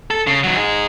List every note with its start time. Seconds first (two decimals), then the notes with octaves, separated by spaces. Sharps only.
0.11 A4
0.27 C#3
0.44 D#3 F#3
0.56 D#4 G#4